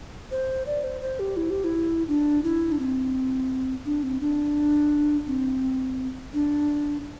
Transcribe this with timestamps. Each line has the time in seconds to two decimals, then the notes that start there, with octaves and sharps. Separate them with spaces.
0.31 C5
0.67 D5
0.84 C5
1.01 C5
1.20 G4
1.37 E4
1.50 G4
1.64 E4
2.08 D4
2.44 E4
2.72 D4
2.79 C4
3.85 D4
4.03 C4
4.21 D4
5.27 C4
6.34 D4